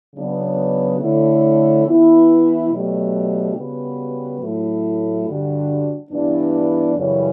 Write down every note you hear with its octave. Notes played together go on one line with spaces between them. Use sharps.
C#3 F#3 B3 D4
D3 A3 E4 A4 C#5
E3 B3 E4
B2 F#3 A3 D4 G4
C#3 G3 B3 F#4 B4
A2 F#3 A3 E4 A4
G2 D3 G3 D4 F#4
G2 E3 B3 D4
F#2 C#3 E3 G3 C#4